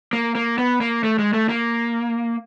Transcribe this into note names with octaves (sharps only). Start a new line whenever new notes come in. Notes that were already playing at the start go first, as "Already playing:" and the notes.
A#3
A#3
B3
A#3
A3
G#3
A3
A#3